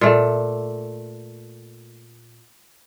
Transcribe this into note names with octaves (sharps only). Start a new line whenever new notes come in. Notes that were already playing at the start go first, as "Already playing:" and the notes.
A#2 A3